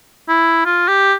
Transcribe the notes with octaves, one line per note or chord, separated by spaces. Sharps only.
E4
F4
G4